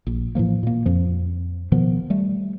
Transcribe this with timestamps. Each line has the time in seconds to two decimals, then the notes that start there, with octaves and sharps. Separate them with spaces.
0.07 A#1
0.35 A2 E3 F3 A#3
0.63 A#2 A#3
0.86 F2 F3
1.72 B2 D#3 F3 B3
2.10 G3 A3